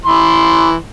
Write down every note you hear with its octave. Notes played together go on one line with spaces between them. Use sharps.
E3 C6